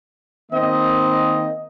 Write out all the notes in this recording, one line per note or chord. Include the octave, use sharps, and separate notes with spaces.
D#3 A#3 C4 D#5